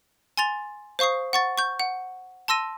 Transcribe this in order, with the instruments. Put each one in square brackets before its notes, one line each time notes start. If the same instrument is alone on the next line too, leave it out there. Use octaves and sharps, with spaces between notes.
[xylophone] G#5 C6 A6 F7
C5 F5 C#6 D#6 C7
F#5 C#6 A6
C#6 G6
F#5
A5 C6 E6 A#6 D#7